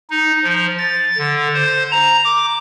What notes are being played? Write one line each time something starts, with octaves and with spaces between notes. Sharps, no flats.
D#4
F3
A6
D3
C5
A#5
D6